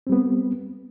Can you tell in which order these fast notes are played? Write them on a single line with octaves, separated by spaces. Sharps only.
C4 G3 B3